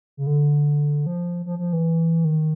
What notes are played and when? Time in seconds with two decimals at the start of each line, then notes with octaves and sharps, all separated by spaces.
0.17 C#3
0.27 D3
1.06 F3
1.46 F3
1.59 F3
1.73 E3
2.25 D#3